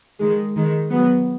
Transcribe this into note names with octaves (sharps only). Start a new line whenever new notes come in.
D#3 G#3
D#3 G#3
F#3 B3